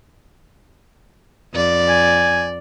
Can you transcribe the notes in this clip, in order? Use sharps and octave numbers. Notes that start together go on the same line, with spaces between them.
F2 D5
G#5